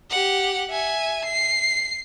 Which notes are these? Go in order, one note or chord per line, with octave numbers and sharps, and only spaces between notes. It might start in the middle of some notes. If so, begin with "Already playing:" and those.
G4 F#5
E5 G#5
C7